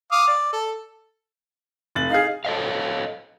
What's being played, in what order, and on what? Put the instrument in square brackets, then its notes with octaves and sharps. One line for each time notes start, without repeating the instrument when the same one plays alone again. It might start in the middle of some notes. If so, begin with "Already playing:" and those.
[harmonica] F5 D6 D#6
D5
A4
[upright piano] F1 A6 F#7
[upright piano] D#4 G#4 [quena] F5
[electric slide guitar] A4 C#5 D#5 F5